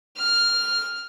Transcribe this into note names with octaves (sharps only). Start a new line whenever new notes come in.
F6